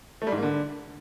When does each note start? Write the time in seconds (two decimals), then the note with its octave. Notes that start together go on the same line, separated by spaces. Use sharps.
0.22 A3
0.27 G3
0.32 G#2
0.37 A#3
0.43 D3